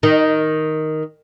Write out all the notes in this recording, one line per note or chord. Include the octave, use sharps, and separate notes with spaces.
D#3